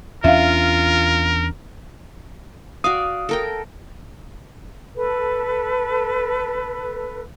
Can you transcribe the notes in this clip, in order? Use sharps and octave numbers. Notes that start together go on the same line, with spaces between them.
E2 C#4 D4 F4 A#4 E5 F5
F#4 D5 F5 D#6
A4 A#4 G5
A4 B4